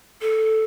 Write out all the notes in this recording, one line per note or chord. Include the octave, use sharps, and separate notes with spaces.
A4